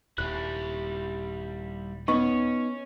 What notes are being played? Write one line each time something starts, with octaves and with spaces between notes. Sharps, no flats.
D#1 G3 E4 F#6
B3 C#4 D#4 C#6